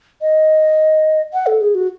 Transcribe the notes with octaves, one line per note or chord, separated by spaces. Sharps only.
D#5
F#5
A4
G#4
F#4